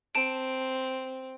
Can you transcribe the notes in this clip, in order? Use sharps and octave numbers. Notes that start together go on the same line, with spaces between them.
C4 A5 D7